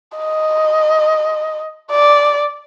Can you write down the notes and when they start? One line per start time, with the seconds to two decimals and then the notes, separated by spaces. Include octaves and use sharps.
0.18 D#5
1.91 D5